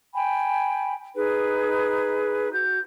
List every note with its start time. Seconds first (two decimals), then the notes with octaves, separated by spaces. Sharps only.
0.14 G5 G#5 B5
1.15 D#4 G#4 B4
2.52 F#4 G6